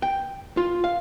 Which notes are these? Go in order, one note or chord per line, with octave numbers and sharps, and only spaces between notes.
G5
F4
F5